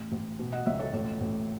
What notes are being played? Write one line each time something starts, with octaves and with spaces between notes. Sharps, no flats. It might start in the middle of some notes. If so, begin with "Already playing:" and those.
Already playing: A1
A1
B2
D#5 F#5
C#2 C#5 E5
A4 C#5
A1 A4 C#5
A1